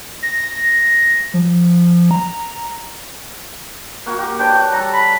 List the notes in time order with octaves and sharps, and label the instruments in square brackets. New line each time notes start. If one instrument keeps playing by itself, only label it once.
[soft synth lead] A#6
F3
A#5
[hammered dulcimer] A#3 F#4 A#4
F#4 G4
[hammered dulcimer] D4 B4 C#5 [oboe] G5
[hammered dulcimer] F#4
[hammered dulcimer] G3 A4 [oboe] A#5
[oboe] B5